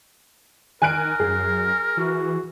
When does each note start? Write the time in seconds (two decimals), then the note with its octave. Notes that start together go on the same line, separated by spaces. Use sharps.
0.82 D#3 A#4 G#5 F#6 D7
1.20 F#2 G#4
1.97 E3 F#4